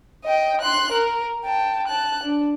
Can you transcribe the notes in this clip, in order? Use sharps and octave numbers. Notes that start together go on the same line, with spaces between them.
D#5 G5
C6 F#6
A#4
G5 A5
A5 F#6
D4